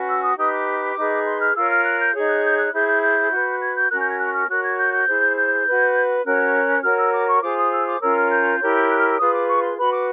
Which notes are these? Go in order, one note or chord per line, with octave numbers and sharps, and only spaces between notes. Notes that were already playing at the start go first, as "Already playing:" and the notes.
Already playing: C#4 F#4 B4
E6
D#6
D#4 G4 B4 D#6
D6
D#4 G#4 B4
C6
F6
F4 A#4 C#5 E6
F6
F#6
G6
D#4 G#4 C#5
F#6
G6
F#6
E4 G#4 C5 G6
G6
G6
F#4 B4
G#6
G6
C#4 F#4 A#4 F#6
G6
G#6
F#6
F6
F#4 A#4 C#5 F#6
G#6
G6
G6
E4 G#4 C5
G6
F#4 B4
C#4 F#4 A#4 C#5 F#6
F#4 A#4 C#5 F6
E6
D6
C#6
F4 G#4 C5 D6
D#6
E6
D6
C#4 F4 A#4 C#5 E6
F6
G6
E4 G4 A#4 C#5
F#6
F6
E6
F4 G#4 B4 D#6
D6
C#6
C6
F#4 B4 B5
D6